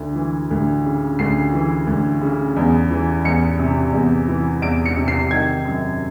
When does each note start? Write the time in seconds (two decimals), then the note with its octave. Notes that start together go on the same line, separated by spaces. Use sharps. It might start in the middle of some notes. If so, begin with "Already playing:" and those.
Already playing: D2
0.15 E3
0.51 D2
0.85 C#3
1.19 D2 C7
1.54 E3
1.87 D2
2.21 C#3
2.56 E2
2.90 E3
3.25 E2 C#7
3.59 C3
3.93 E2
4.28 E3
4.62 E2 D7
4.86 C#7
4.96 C3
5.08 C7
5.31 D#3 G#6
5.65 F#2